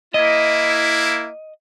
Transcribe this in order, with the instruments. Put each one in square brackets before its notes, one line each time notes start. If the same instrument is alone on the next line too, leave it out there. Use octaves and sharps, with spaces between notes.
[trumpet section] A#3 E4 [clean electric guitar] D#5